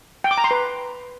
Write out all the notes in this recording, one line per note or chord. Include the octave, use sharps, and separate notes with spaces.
G5
D6
A#5
C6
B4